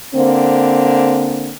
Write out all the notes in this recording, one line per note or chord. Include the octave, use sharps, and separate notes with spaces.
D3 A#3 C4